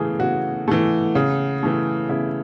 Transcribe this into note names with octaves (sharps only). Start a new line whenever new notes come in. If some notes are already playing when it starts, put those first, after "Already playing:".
Already playing: C#3 E3 A3 G#4
C#3 F#4
E3 A3
C#3
E3 A3
C#3 E4